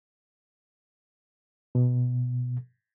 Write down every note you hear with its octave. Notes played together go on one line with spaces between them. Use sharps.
B2